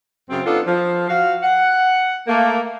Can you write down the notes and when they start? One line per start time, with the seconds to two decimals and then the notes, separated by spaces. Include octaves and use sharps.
0.30 F#2 C#3 C4
0.46 B3 D4 D#4 F4 A4
0.66 F3
1.09 F#4 F5
1.43 F#5
2.28 A3 A#3